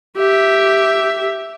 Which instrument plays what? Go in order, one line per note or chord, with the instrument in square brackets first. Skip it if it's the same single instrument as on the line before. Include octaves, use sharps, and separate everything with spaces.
[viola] G4 E5